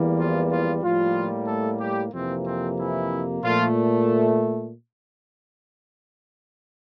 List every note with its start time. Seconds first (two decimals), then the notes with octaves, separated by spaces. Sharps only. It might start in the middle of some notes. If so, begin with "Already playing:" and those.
Already playing: E2 E3 G3 A#3
0.18 F3 F4
0.50 F3 F4
0.82 A2 F3 G3 A#3 F4
1.47 A3 A4
1.80 G3 G4
2.13 F2 C3 E3 A#3 C4
2.46 C4
2.79 E3 E4
3.43 A#2 F3 A3 F4